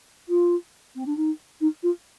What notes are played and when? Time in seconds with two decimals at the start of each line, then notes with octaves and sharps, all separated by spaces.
0.28 F4
0.95 C4
1.06 D4
1.16 D#4
1.61 D#4
1.83 F4